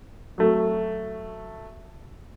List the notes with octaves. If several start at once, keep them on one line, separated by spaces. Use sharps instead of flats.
F#3 A3